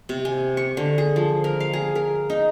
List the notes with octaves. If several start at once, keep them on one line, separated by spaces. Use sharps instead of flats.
C3
G#5
C#6
D3
G#4
F3
A#4
F5
G#4
A#4
D#4